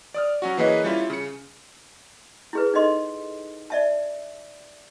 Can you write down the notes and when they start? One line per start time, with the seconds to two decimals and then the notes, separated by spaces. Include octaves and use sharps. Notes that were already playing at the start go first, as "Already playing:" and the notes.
0.14 D5 D#6 F6
0.42 F#3 C#4 F#4
0.57 E3 A#3 G#4 B4 C#5 D#5
0.84 G3 C#4 E4 F4
1.10 C#3 C#7
2.53 E4 G#4 B4
2.74 D#4 A4 D#5 C6
3.70 D5 E5 A5